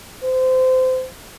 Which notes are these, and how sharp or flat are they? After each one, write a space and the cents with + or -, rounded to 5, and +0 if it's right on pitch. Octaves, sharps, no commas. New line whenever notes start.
C5 -25